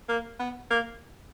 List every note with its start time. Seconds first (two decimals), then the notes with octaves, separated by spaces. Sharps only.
0.09 A#3
0.40 B3
0.71 A#3